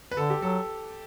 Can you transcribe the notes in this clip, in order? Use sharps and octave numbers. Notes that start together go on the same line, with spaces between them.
B4
D3 A4
G4
F#3 A4